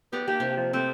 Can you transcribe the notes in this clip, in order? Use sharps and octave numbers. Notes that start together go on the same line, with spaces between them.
B3 G4 D5 A#5
A#3 G4
C3
F3
A3 C4